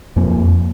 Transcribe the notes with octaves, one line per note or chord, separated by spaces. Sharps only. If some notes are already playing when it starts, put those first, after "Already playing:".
F2 F3 A#3